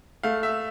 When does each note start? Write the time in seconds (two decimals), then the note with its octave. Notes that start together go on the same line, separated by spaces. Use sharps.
0.23 A3 F5
0.43 E5